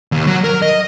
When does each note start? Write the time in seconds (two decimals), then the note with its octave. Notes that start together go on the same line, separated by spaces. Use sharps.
0.12 D#2
0.27 F#3
0.44 A#4
0.62 D#5